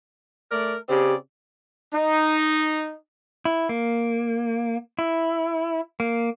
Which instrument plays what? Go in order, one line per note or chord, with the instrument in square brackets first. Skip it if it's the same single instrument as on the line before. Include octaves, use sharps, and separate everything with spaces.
[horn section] A3 A#4 D5
[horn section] C#3 C4 D5 [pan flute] G4
[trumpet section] D#4
[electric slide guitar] E4
A#3
E4
A#3